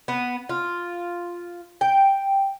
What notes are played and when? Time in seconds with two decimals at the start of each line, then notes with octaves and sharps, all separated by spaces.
0.08 B3
0.49 F4
1.81 G5